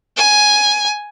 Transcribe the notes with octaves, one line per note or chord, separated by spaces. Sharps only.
G#5